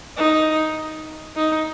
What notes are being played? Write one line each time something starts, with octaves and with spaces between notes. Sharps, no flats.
D#4
D#4